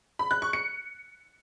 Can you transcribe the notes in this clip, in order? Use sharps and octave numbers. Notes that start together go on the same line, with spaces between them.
B5
F#6
C#6
C#7